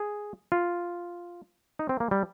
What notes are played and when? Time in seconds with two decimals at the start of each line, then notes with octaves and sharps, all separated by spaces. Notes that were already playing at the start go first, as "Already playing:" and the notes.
Already playing: G#4
0.52 F4
1.79 D#4
1.89 C4
2.00 A#3
2.11 G3